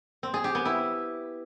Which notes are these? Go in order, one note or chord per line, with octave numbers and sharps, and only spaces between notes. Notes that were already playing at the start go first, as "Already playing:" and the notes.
C4
G#4
G4
B3
E4